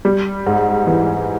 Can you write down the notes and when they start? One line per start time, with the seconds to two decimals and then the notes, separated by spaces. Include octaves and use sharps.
0.05 G3
0.46 G#2
0.87 E3